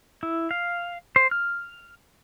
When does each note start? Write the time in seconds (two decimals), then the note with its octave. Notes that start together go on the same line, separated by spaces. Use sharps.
0.23 E4
0.51 F5
1.16 C5
1.31 F6